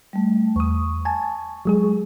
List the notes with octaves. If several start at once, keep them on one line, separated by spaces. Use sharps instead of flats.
G3 A3
E2 C#6 D#6
G#5 A5
F#3 G#3 G#4